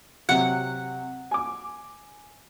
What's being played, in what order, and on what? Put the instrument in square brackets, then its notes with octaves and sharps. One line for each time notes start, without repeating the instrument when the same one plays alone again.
[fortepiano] C3 F#3 [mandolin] F#5
[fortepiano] G#5 D6